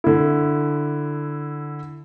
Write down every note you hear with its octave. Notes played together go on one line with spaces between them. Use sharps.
D3 E4